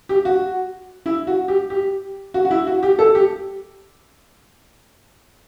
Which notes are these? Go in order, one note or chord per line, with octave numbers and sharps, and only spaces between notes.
G4
F#4
E4
F#4
G4
G4
F#4
F#4
E4
F#4
G4
A4
G4